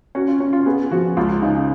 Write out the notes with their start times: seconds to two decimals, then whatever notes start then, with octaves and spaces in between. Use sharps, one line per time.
0.15 C#4 F#4
0.28 F4
0.40 C#4
0.53 F4
0.66 B3 G#4
0.91 F3 F#4
1.17 C#2 F4
1.31 F4
1.42 C#3 D#4